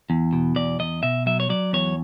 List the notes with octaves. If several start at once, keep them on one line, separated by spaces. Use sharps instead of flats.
E2
B2
E2 D5
E2 D#5
B2 E5
F#3 E5
C#5
F#3 D5
E2 C#5